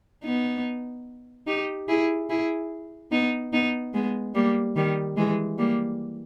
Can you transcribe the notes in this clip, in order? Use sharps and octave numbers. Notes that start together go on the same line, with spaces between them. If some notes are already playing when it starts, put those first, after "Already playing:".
B3 D#4
D#4 G4
E4 G#4
E4 G#4
B3 D#4
B3 D#4
G#3 B3
G3 A#3
D#3 G3
E3 G#3
G3 A#3